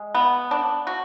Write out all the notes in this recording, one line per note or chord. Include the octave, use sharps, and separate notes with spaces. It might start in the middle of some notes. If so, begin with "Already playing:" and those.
Already playing: G#3
B3
D4
F#4